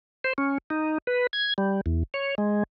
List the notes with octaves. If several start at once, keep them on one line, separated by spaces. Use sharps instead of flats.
C5
C#4
D#4
B4
G#6
G3
E2
C#5
G#3